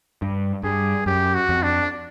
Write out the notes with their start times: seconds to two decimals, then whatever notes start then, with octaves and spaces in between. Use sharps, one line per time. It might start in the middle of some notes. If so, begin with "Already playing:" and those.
0.22 G2
0.63 G2 G#4
1.06 F#2 G4
1.34 F#4
1.49 F2
1.63 D4